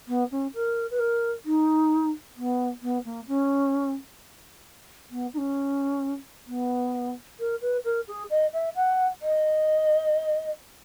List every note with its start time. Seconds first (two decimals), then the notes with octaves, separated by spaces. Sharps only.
0.08 B3
0.31 C#4
0.54 A#4
0.91 B4
0.99 A#4
1.45 D#4
2.36 B3
2.82 B3
3.05 A#3
3.28 C#4
5.11 B3
5.33 D#4
5.38 C#4
6.47 B3
7.39 A#4
7.61 B4
7.84 A#4
8.08 G#4
8.30 D#5
8.53 E5
8.75 F#5
9.22 D#5